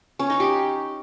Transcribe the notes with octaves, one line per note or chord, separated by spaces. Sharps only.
C#4
D#4
G4